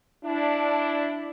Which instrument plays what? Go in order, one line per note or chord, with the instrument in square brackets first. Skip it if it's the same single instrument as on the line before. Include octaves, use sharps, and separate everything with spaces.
[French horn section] D4 E4